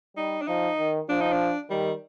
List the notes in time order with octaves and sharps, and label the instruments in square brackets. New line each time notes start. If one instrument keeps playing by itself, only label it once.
[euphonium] G3 [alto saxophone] D#4
[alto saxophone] D4
[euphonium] F3 [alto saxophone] D#4
[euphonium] D#3
[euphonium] F3 [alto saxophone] D4
[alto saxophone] D#4
D4
[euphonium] D#3 [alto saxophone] G3